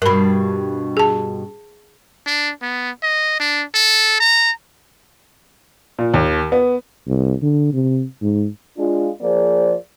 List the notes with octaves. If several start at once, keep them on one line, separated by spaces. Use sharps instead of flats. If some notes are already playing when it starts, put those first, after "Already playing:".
G2 B2 A#4 B5
G#4 A5
D4
B3
D#5
D4
A4
A#5
A#2
D#2
B3
C2
D3
C3
G#2
G#3 D4 F4
F3 A#3 G#4 C5 D5